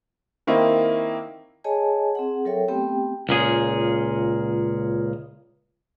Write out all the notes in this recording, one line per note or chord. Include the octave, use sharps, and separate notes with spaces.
D#3 A#3 C4 E4 D#5
G#4 C#5 D#5 G#5 A5
C4 G#4 F#5
F#3 A4 A#4 C#5 E5 G5
A3 B3 C4 G4 G5
C#2 A#2 G#4